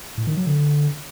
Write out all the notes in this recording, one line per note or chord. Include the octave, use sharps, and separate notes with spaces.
A2
D#3
F#3
D3